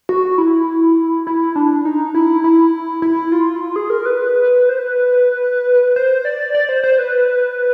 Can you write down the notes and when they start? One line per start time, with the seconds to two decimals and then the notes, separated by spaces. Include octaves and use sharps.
0.09 F#4
0.38 E4
1.27 E4
1.56 D4
1.85 D#4
2.15 E4
2.44 E4
3.02 E4
3.32 F4
3.56 E4
3.61 F4
3.76 G#4
3.90 A#4
4.06 B4
4.69 C5
4.79 B4
5.96 C5
6.25 D5
6.55 D5
6.69 C5
6.84 C5
6.99 B4